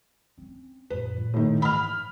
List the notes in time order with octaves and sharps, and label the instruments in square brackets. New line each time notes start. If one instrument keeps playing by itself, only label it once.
[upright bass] C4 C#4
[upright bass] F#2 A#2 [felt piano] B4
[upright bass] F#2 A#2
[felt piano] A2 D#3
[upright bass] G#2 E3 [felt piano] B5 F6